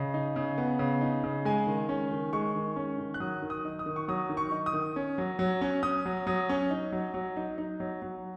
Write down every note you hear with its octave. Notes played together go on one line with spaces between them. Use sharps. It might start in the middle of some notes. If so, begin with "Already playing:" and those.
Already playing: C#3 D#5
D#4
C#3
B3
C#3
D#4
C#3
G#3 G#5
D#3
C#4
D#3
G#3 C#6
D#3
C#4
D#3
F#6
F#3 D#6
D#3
D#6
D#4
D#6
D#3
C#6
F#3 D#6
D#3
C#6
D#4
D#6
D#3
C#4
F#3
F#3
C#4
C#4 D#6
F#3
F#3 D#6
C#4
D#4
F#3
F#3
D#4
D#4
F#3
F#3